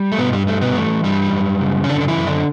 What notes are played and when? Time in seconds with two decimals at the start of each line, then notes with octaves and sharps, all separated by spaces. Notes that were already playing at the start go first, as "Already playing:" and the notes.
Already playing: G3
0.12 A3
0.19 G2 B2 B3
0.33 G3
0.47 G3 A3
0.61 B2 B3
0.75 E3 A3
1.04 G2 G3
1.32 F#2
1.61 C#3
1.84 C#4
1.89 F#2 D3 D4
2.01 D4
2.08 E3 E4
2.17 F#2
2.27 D3 D4